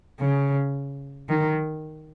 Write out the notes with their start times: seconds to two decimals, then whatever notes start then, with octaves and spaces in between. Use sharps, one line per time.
0.20 C#3
1.29 D#3